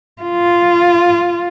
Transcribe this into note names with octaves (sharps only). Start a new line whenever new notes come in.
F4